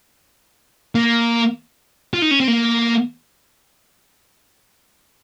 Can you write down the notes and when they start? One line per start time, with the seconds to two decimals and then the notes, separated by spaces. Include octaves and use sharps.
0.95 A#3
2.14 F4
2.22 D#4
2.31 C#4
2.40 C4
2.48 A#3